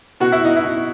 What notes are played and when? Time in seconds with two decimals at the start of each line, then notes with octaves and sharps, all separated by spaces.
0.20 B2 F#4
0.32 E4
0.45 D#4
0.56 E4
0.63 B2